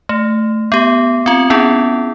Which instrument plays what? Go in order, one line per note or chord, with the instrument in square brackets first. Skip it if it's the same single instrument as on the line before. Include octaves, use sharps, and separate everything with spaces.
[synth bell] A3
B3 G4
C4 F4
B3 C#4 E4 G#4